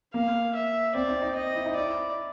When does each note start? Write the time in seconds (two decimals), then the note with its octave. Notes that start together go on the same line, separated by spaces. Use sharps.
0.14 A#3 F5
0.54 E5
0.95 C4 D5
1.08 D#4
1.22 D#4
1.35 D#5
1.55 E4
1.66 D#4
1.76 E4 D5